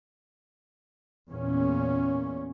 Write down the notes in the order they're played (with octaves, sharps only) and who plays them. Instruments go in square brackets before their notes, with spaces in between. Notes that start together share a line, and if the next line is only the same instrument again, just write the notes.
[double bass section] E2 A#2 C#4